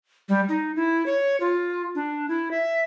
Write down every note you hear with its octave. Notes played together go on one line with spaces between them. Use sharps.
G3
D#4
E4
C#5
F4
D4
E4
E5